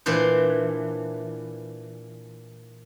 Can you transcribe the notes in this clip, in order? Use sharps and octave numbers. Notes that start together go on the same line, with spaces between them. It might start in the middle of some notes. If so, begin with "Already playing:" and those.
A#2 E3 D4 C5